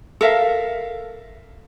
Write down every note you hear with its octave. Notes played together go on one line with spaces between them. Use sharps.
A4 A#4 E5 F5